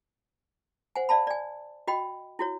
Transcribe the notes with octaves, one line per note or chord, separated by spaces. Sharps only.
C5 F#5 G#5
D5 F5 A5 B5
D5 G#5
F#4 D#5 G5 B5
E4 F#4 C#5